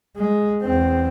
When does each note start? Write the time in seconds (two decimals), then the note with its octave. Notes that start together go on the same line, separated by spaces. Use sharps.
0.16 G#3
0.62 E2 C4